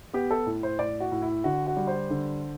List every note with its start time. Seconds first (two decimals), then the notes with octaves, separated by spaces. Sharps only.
0.14 B3 G4
0.31 A4
0.46 A2
0.63 C5
0.79 A2 D5
1.00 F#4
1.12 A2
1.22 E4
1.44 D3 F#4
1.67 F#4
1.77 G3
1.87 C5
2.10 D3